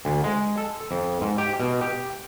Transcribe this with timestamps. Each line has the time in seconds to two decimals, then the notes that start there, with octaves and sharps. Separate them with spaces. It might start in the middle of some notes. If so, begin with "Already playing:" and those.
0.05 D2
0.24 G#3
0.58 A4
0.91 F2
1.21 G#2
1.38 G4
1.60 B2
1.81 G4